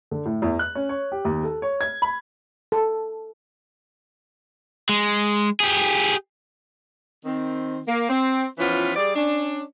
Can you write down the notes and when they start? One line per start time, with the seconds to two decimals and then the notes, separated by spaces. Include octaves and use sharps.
0.11 D3
0.25 A2
0.42 E2
0.59 F#6
0.75 C#4
0.89 C#5
1.12 G4
1.25 D#2
1.43 A4
1.62 C#5
1.81 G#6
2.02 B5
2.72 A4
4.89 G#3
5.60 G4 G#4
7.25 D#3 C4
7.87 A#3
8.10 C4
8.59 E3 F3 B3 C#4 F4
8.96 G3 G#4 D5
9.15 C#4 D4